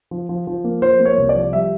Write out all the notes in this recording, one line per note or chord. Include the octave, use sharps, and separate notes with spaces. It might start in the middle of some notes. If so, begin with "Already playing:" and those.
F3
F3
F3
A#3
F3 C5
A#3
C#5
C2
D5
F3
G3 E5